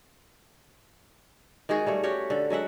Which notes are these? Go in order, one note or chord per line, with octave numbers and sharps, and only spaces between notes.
D#3 G#3 F#4 G#4
G3 A3 C#5
C#4 F#4 G4 C#5
D3 A4
F#3 G#3 E5 F#5